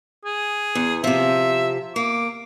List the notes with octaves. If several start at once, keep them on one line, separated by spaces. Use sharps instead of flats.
G#4
E2
C3 F3 E5
A#3 D6